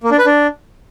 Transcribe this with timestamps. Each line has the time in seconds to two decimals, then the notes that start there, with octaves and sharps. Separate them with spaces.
0.04 A#3
0.11 D4
0.18 B4
0.26 D4